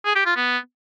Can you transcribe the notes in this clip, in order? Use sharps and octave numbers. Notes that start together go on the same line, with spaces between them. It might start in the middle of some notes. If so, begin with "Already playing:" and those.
G#4
G4
F4
B3